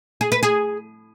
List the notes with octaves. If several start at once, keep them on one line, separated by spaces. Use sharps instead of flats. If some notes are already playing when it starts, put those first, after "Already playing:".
G#4
B4
G#4